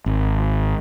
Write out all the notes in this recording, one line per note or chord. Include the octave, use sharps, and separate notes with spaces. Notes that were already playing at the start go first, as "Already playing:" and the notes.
G#1